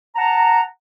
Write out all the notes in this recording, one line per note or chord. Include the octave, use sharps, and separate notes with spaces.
F#5 A5 A#5